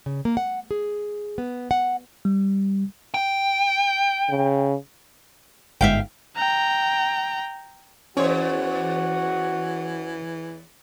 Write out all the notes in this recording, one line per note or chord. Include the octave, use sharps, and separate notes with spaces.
C#3
A#3
F#5
G#4
B3
F#5
G3
G5
C#3
G1 G#2 E5 F5 G5
G5 A#5
E2 E3 C#4 F#4 C5 C#5